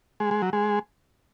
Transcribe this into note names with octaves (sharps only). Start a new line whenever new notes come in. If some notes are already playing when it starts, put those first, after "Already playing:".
G#3
G#3
F#3
G#3